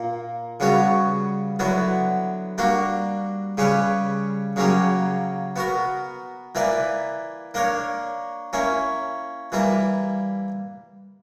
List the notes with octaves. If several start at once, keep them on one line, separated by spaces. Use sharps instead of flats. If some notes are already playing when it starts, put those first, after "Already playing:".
Already playing: A#2 A#3
C#3 G3 B3 F#4 C#5
D3 F#3 B3 E4
G3 A#3 D4 F#4
C#3 G3 C#4 G4 B4
C#3 F#3 A#3 C#4 G4
B3 F#4 A#4
E3 A#3 E4 B4 D5
A#3 D4 A#4 C#5
A#3 C#4 E4
E3 G3 A#3 E4